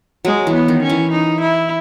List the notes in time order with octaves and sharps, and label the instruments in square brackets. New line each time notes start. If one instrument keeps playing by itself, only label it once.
[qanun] F#3 [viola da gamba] G#3
[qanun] E3
[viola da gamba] B3
[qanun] D#3
[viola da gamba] C#4
[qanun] E3
[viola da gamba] D#4
E4